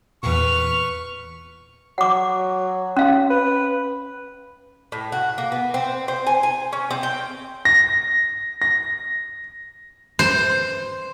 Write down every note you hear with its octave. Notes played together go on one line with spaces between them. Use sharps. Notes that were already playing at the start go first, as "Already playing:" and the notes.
E2 A#2 B4 C#6 F6
F#3 F#5 D6
C#4 F5
B4
A2
F#4
A#3
B3
C4
C5
G#5
G#5
C#4
C4
G5
A#6
A#6
C5